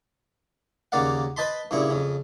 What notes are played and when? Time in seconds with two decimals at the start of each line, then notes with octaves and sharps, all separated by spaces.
0.92 D#2 C#3 A#3 D5 F5 F#5
1.37 B4 C5 D#5 A5 B5 C6
1.71 G2 A#2 C#3 E4 G#4 C#6
1.90 F2 C#3